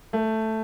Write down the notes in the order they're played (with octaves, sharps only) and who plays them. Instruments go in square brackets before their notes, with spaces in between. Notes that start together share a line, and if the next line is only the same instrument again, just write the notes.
[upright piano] A3